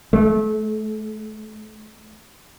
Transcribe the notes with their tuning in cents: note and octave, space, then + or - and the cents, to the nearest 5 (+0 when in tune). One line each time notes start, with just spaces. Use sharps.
A3 -30